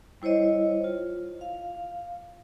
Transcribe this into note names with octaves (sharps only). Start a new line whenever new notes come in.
G3 E4 C5 C#5 D#5
F4
F5